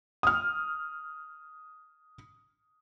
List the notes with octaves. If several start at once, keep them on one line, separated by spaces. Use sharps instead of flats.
D#6 F6